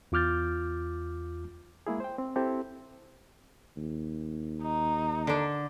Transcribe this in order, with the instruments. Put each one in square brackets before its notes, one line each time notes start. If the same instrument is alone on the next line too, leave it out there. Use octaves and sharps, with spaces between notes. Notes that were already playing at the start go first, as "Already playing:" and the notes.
[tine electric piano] E2 F4 D6 F6 G6 A6
[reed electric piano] G#3 A#3 E4 G#4
C5 G5
C4
C4 E4 G4 A4
[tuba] D#2
[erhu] D#4
[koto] D3 D4